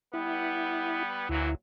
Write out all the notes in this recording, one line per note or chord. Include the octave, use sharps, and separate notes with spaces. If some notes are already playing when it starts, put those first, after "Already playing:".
G3 B3 E4
D2 A#2 E3 F#3 E4